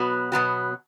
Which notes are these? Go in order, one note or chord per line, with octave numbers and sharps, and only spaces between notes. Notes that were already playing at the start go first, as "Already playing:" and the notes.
Already playing: B2 F#3 B3 F#4
B2 F#3 B3 F#4